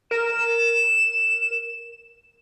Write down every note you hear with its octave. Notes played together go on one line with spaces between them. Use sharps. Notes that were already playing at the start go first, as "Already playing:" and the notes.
A#4 E7